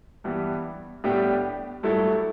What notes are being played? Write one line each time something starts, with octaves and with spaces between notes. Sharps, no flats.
G2 E3 G3 B3
A2 G3 B3 D4 G4
G2 F#3 A3 E4 A4